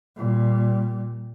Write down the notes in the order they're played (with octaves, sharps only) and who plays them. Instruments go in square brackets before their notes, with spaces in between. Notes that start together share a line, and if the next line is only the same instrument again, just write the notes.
[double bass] A#2 G3